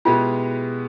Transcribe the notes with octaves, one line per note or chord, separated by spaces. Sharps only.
B2 G#3 B3 E4 F4 G4